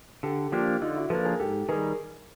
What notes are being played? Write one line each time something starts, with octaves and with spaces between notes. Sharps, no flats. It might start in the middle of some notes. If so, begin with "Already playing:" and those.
D3 G4 A4
F3 A#3 D4 F4 G4
D3 D#4 F4
E4 F#4
F3 A#3 D4 A4 B4
G#4 A#4
G#2 G4 A4
D#3 G3 G#4 A#4